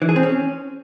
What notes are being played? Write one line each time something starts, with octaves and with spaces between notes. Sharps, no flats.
E3
G#4
C4
C#4